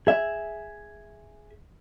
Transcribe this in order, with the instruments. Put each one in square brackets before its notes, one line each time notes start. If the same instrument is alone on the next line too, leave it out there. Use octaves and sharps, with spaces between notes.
[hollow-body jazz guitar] G#4 E5